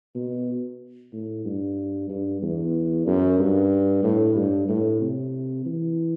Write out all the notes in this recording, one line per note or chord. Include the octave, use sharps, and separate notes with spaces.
B2
A2
G2
G2
E2
F#2
G2
A2
G2
A2
C3
E3